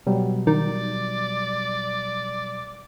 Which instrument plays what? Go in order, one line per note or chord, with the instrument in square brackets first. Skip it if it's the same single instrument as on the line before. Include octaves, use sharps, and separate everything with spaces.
[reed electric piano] B2 F#3 G3
[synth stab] D#3 [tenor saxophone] D5